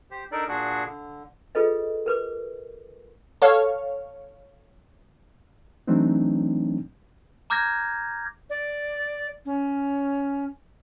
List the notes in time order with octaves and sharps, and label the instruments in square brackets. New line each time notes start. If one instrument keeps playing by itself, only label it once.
[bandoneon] G4 C5
D4 D#4 A4 A#4 D5
A#2 D4 F#4 G#4 F#5
D3
[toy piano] F4 G#4 A4 B4 D#5
A#4 B4 D6
[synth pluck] A4 C#5 F5
[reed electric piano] E3 F#3 A3 C4 D4 D#4
[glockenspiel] A#5 D6 F6 G6 G#6 A#6
[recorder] D5
C#4